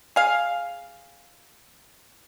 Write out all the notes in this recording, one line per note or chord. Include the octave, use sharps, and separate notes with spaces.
G#4 F5